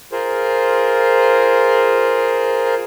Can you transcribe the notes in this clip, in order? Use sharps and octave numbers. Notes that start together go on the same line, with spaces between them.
F4 G#4 A#4 C5